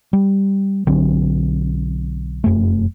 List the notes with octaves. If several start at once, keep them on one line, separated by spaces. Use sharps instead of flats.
G3
B1 D3 F#3 C4
F1 F#2 A3